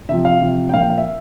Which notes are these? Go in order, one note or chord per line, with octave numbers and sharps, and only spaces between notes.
C3 F3 E5
F5
C3 F3
G5
A#2 F3 F5
G5
F5
E5